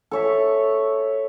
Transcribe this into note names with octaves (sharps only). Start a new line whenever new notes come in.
A4 C#5 E5